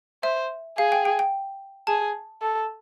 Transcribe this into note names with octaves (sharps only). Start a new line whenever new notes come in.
C5 E5
G#4 F5
G5
G5
G5
G#4 A5
A4